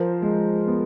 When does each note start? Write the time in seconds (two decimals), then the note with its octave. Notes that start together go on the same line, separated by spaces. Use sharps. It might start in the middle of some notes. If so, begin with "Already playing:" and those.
Already playing: F3 A#4 C5
0.22 G#3
0.67 B3